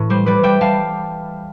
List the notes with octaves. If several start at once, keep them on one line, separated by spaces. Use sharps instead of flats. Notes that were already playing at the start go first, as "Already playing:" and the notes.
Already playing: A2 E3
G3 C5
G3 B4 D5
G3 E5 G5
G3 F5 A5